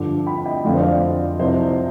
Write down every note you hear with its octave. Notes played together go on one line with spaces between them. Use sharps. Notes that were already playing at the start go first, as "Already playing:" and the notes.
Already playing: G2 D3 F3 D6
G5 B5
D#5 G5
F2 D3 F3 D5 F5
C5 D#5
D5 F5
C2 C3 F3 C5 D#5